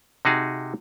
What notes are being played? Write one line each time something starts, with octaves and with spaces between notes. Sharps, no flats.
C3 D#4 F#4 G#4 A5